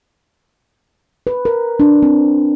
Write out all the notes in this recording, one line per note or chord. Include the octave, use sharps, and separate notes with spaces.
B4
A#4
D4
C4